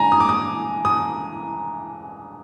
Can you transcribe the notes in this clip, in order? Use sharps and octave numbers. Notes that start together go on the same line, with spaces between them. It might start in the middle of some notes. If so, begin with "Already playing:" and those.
Already playing: D3 G#3 G#5 A#5
D#6
D6
D#6
D#6